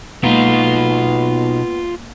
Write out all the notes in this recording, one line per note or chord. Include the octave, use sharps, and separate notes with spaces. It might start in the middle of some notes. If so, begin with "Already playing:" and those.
B2 G#3 A#3 B3 D#4 F4